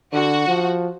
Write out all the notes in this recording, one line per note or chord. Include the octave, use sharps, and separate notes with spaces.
D3 F#4
F3